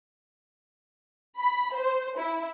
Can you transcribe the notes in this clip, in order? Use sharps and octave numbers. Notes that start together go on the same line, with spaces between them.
B5
C5
E4